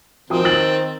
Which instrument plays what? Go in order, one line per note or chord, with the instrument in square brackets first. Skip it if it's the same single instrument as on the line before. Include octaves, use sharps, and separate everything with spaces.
[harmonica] D#3 C4 [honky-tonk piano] F3 G5 D#6
[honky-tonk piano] E6 A6 F#7